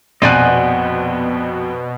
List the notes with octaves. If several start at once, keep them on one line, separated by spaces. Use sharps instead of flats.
A#1 F2 B2 C4 D5 D#5 F#5 G#5